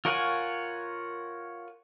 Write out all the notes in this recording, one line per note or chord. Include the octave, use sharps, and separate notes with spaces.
F4 A#4 C#5 F#5 G#5